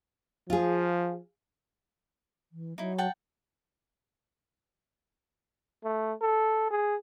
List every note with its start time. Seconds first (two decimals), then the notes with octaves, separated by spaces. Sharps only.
0.50 F3 F4 G#4
2.52 E3
2.78 F#3 D#4 E4
2.98 F#5 G5 A5
5.84 A3
6.22 A4
6.71 G#4